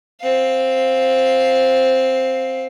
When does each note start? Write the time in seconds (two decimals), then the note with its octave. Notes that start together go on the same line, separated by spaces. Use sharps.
0.21 C4 F5